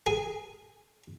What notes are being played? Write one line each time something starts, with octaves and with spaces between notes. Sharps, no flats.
G#4